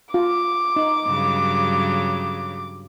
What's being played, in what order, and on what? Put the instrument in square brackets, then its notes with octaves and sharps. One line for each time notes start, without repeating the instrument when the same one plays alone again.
[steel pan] F4 [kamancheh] D6
[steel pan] D#4
[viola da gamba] G2 C#3 F#3